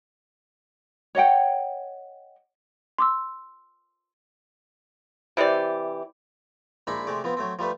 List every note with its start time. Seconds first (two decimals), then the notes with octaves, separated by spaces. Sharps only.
1.15 C#5 D#5 F#5 G5
2.99 C6 D6 E6
5.37 C3 E3 G4 D5
6.87 A#1 G#3 D4 D#4 E5 B5
7.07 C3 G#3 A3 D5
7.24 F3 B3 C4
7.37 F#3 A3 C4
7.59 F3 G3 A3 B4